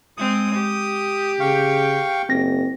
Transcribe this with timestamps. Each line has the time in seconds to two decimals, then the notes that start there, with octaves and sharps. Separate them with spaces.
0.17 G#3 C4 D#6
0.54 G4
1.40 C#3 F5 G5 C#6
2.29 F#1 C4 A#6